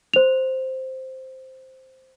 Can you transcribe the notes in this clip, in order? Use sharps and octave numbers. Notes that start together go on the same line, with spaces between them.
C5 F7